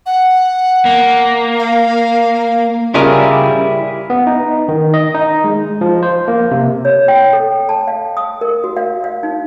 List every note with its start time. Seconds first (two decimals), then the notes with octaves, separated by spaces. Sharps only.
0.06 F#5
0.85 A#3
1.59 F5
2.94 C#3 G3 E4 F4 A#4 D5 G#5
4.10 B3
4.27 D#4
4.68 D#3
4.94 D#5
5.15 D#4
5.44 G#3
5.81 F3
6.03 C5
6.28 A#3
6.51 C3
6.85 C#5
7.08 G5
7.33 A4
7.69 A5
7.87 F5
8.17 D#6
8.41 A#4
8.64 F#4
8.77 F5
9.04 F5
9.23 D#4